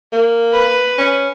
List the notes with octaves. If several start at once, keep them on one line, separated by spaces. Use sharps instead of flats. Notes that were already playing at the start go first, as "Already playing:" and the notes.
A#3
B4
C#4